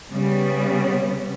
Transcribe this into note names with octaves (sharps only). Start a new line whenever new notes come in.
C#3 G3 B3